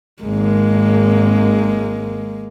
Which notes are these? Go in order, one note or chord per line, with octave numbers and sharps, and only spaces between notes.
G#1 G#3 A#3